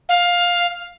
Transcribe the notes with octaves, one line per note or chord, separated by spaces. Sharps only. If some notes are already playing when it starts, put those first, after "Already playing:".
F5